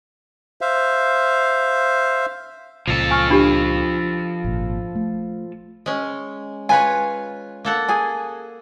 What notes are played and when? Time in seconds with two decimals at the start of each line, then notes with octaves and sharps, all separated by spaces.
0.61 C5 E5 F5
2.88 C#2 A#2 C#3 F3 A4
3.11 G#5 C#6 F6
3.30 D4 G4 B5
4.44 G#1 A#2
4.95 A3
5.86 G#3 C#4
6.69 F4 B4 C#5 G#5
7.65 A#3 A4 F#5
7.89 G#4 G#5